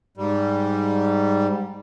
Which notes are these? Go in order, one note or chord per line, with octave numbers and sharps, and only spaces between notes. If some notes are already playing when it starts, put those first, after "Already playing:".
G#2 G3